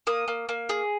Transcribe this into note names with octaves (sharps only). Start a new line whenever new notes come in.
A#3 D#6
A#3
A#3
G#4